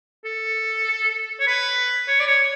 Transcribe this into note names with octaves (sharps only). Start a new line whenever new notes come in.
A4
C#5
B4
C#5
D5
C#5